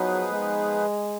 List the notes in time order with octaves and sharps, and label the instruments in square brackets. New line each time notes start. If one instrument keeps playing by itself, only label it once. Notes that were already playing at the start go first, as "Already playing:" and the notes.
Already playing: [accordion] F3 B3 D#4 G#4 B4 [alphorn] F#3
[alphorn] G#3